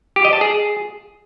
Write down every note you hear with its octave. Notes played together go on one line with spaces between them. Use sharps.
G4
D#5
A5
G#4